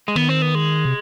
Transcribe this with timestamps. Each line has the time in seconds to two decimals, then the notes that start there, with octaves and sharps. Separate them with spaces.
0.08 G#3
0.16 D#3 B3
0.29 C4
0.42 B3
0.55 G#3
0.85 C3